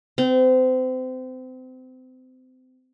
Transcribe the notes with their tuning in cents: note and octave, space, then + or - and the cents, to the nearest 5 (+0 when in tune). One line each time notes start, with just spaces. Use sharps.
C4 -30